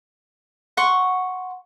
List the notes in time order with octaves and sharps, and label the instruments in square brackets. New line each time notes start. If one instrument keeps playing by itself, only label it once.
[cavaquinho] F#5 C6 C#6